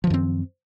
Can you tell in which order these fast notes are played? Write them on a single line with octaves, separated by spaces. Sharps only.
F3 D#3 F#2 C4